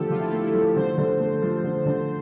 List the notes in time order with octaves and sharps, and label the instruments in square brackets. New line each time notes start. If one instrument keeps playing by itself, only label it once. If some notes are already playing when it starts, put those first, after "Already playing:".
Already playing: [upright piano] D3 F3 A3 [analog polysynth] G4 A4
[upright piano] D3 [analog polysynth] F4
[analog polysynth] E4
F4
[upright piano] A3
[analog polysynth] E4
[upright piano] F3
[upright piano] D3 [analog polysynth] C5
[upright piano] D3
A3
F3
D3
D3